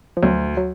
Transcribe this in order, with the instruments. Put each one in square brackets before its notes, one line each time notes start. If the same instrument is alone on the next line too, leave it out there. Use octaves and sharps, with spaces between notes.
[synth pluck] F3
[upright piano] D2 [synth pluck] F#3
[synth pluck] F#3